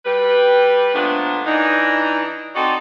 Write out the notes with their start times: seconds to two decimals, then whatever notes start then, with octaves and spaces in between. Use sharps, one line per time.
0.06 G3 G4 B4
0.94 A#2 F3 A3 B3 D4
1.46 E3 D4 D#4
2.55 C4 D#4 F#4 A4 D5